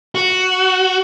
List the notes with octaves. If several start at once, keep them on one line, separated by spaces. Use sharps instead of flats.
F#4